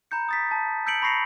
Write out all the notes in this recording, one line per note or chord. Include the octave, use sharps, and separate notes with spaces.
A#5 B5 G6 C#7
D#6 A6 B6
A5
E6 G6 B6 C#7 D7 F#7
B5 C#6 A#6 C7 C#7 F7